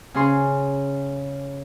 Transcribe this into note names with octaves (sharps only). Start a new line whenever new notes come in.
C#3 C#4 G#4 C6 C#6